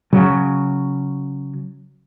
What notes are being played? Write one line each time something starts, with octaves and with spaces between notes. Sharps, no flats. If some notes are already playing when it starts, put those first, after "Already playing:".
C#3 F#3